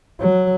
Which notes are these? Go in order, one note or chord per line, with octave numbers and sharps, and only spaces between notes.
F#3